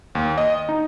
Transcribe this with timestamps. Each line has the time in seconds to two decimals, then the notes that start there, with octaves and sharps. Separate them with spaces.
0.15 D#2
0.38 D#5
0.69 D#4